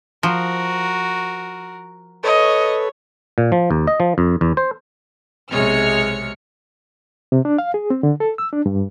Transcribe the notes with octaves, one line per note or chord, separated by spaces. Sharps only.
F3 F#4 A#4
A4 B4 C#5 D#5 C#6
A#2
F3
D#2
D#5
F3
F2
E2
C5
B1 C3 G#3 C#5 F6 C#7
C3
D4
F5
G#4
C4
D3
A4
E6
D4
G2